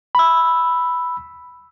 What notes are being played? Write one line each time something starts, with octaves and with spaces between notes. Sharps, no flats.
B5 E6